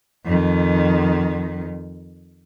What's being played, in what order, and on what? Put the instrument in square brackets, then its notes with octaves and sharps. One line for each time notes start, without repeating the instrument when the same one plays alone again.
[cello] F2 D#3